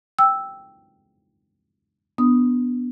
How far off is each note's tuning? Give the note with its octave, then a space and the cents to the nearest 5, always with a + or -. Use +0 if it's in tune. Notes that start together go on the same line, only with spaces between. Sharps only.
G5 +0 E6 +0
B3 +0 D4 +0 D#6 +0